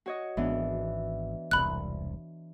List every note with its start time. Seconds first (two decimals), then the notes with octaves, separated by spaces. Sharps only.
0.06 F#4 C#5 D#5
0.37 G#1 E3 B3 D4
1.51 E1 C2 B5 F#6